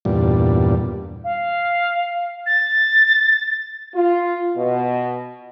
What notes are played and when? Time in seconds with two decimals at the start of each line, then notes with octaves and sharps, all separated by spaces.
0.05 E2 G2 A#2 G3
1.24 F5
2.46 A6
3.95 F4
4.57 B2